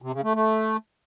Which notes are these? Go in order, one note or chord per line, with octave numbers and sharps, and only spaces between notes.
C3
C#3
A3
A3